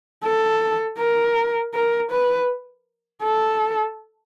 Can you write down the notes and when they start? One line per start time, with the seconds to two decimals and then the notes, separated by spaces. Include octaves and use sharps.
0.24 A4
0.99 A#4
1.74 A#4
2.11 B4
3.23 A4